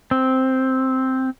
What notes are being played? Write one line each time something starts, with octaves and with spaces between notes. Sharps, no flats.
C4